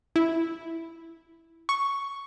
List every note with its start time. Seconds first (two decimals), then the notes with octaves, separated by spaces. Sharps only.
0.16 E4
1.69 C#6